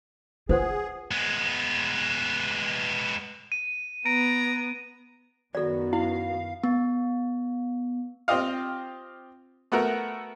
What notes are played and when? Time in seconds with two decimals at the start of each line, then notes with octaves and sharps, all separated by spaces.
0.49 F4 G#4 B4 C5 F#5
1.11 G#3 B3
3.52 D#7
4.06 B3 A#5 D7
5.55 F#2 D#3 B3 F#4 A4 D5
5.93 E4 F5
6.64 B3
8.28 C4 F4 G4 D#5 F5
9.72 A3 B3 F#4 A#4 E5